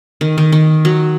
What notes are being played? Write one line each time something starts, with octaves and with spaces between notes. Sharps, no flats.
D#3
D#3
D#3
F#3